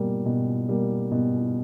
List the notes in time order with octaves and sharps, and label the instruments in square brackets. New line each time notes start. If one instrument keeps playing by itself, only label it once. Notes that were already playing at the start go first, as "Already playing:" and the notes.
Already playing: [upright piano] B2 G3 A#3
B2
G3 A#3
B2